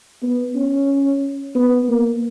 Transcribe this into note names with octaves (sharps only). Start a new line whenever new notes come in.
B3
C#4
B3
A#3